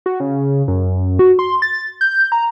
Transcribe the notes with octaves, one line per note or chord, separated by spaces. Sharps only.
F#4
C#3
F#2
F#4
C6
A6
G6
A#5